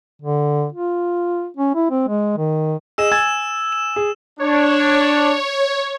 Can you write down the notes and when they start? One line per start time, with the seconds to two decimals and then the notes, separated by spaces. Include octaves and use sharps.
0.22 D3
0.73 F4
1.57 C#4
1.75 E4
1.91 C4
2.08 G#3
2.37 D#3
2.98 G#4 D#5 E6 E7
3.11 G#5 E6 G#6 A6
3.72 E7
3.96 G#4
4.40 D4 C#5